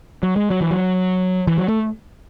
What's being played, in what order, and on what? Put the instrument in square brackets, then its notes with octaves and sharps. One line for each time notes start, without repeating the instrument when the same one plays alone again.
[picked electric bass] F#3
G#3
F#3
E3
F#3
E3
F#3
A3